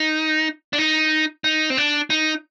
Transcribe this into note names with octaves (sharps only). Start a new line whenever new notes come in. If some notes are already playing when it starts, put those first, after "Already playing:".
Already playing: D#4
D4
D#4
D#4
C4
D4
D#4